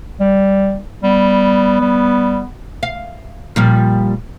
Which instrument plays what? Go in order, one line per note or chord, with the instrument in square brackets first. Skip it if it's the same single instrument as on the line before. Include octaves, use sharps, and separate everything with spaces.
[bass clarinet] G3
[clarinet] G3 [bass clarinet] B3
[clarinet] G3
[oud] F5
A#2 F3 G3